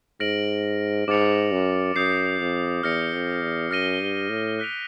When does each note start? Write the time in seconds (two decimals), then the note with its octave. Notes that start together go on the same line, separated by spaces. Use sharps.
0.20 G#2 F6 A#6 D7 F#7
1.08 G#2 D6 F6 A6 C#7 F7
1.52 F#2
1.95 F#2 D#6 G6 C7
2.40 F2
2.83 E2 F6 A#6 C#7
3.13 F2
3.42 E2
3.71 F#2 F6 A#6 D#7 G7
4.01 G2
4.30 A2
4.59 F#6 B6 D7 F7